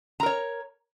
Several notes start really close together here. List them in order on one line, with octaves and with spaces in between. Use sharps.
A#5 A#4 C#5